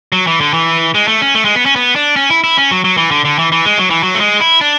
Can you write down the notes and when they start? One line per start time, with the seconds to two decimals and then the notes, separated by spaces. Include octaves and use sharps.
0.12 F#3
0.27 E3
0.41 D3
0.54 E3
0.94 G#3
1.08 A3
1.22 C#4
1.35 A3
1.45 G#3
1.55 B3
1.66 C#4
1.76 B3
1.96 D4
2.16 C#4
2.30 E4
2.44 E4
2.57 C#4
2.71 F#3
2.84 F#3
2.97 E3
3.11 D3
3.25 D3
3.39 E3
3.52 E3
3.65 G#3
3.79 F#3
3.90 E3
4.03 F#3
4.15 A3
4.20 G#3
4.40 E4
4.61 D4